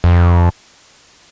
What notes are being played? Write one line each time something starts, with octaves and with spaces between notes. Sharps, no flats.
F2